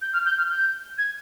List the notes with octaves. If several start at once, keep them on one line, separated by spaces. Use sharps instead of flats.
G6
F6
G6
F6
G6
G#6